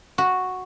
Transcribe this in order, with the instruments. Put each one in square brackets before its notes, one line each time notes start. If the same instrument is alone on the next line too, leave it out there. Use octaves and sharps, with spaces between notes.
[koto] F#4